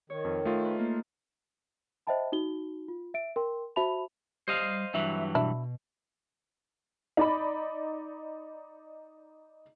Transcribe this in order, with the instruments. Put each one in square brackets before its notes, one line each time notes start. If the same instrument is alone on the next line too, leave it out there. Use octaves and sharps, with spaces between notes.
[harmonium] D#3 [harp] C#5
[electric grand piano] F2
[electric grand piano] A3 F4 [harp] D#4
[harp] B4
A#3
[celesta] C5 D#5 E5 G5 A5 B5
D#4 F#4 G7
F4
E5 D7
A#4 G5 C6
F#4 C5 E5 A5 B5 F7
[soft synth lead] G3 [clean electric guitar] C5 D#5 F5
[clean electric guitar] G2 E3 F#3 [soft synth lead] E5
[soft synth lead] B2 [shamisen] D4 E4
[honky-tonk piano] D#4 D5 B5